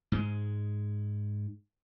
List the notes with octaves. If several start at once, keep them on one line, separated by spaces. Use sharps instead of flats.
G#2 G#3